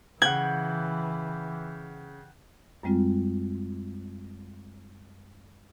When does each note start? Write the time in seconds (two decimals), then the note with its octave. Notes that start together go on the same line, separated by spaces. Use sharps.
0.22 C#3 E3 F#5 G5 G#6 F#7
2.83 F#2 G3 G#3 C4 F4